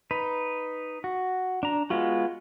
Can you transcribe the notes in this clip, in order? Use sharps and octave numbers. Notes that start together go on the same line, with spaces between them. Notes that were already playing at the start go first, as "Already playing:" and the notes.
D#4 B4
F#4
D4 A#5
G#3 B3 F4 F#4